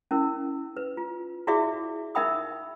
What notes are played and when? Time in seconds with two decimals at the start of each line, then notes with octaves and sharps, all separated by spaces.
0.11 C#4 E4 A#4
0.77 B4
0.97 F4
1.47 E4 F#4 G#4 D5 E5 D6
2.15 D#4 A#4 E5 G5 B5 D#6